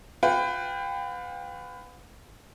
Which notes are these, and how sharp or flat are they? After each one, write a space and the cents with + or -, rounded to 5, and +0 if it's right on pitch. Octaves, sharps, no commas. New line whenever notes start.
F4 +45 B4 +25 G5 +20